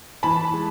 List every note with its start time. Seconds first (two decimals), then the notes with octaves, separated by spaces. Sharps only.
0.23 E3 A5 B5
0.54 G#3